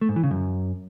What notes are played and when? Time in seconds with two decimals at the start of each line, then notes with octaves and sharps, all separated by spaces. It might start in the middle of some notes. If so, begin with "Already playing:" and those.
0.01 A3
0.09 G#2
0.16 E3
0.23 C#3
0.31 F#2